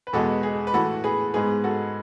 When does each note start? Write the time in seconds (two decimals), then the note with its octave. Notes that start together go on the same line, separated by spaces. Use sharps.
0.07 B4
0.13 E2 B2 G#3 B3 F#4 A4
0.43 G#4
0.67 B4
0.74 A2 E3 A3 F#4 A4
1.04 G#4 B4
1.34 G#2 G#3 B3 G#4 B4
1.64 F#4 A4